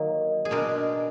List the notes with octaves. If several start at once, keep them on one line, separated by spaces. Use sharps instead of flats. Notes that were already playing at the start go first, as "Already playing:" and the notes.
Already playing: D#3 F#3 A#3
G#4
B2 G#3 D4 A#4